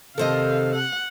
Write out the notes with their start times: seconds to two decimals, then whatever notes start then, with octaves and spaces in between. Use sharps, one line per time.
0.18 C3 D#3 A4 C5 D#5 F5
0.75 F#5